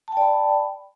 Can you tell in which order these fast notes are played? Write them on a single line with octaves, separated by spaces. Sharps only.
A5 G5 D5 B5